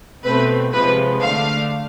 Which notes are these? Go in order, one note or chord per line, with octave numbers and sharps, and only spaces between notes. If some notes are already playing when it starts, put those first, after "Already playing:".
B2 A3 C4 B4
C3 F3 G#3 B4
D3 A3 D4 F5